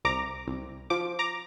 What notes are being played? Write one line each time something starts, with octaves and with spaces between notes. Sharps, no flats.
C2 A#5 D6
C2
F3 D6
A#5 D6